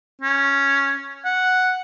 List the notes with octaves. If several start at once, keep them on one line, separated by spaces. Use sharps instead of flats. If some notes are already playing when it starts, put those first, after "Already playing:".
C#4
F#5